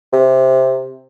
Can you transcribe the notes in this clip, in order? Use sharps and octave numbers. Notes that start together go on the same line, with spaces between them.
C3